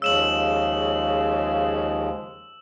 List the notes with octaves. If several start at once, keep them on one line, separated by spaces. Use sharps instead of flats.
D#2 C#3 F3 G#3 E6 E7 F#7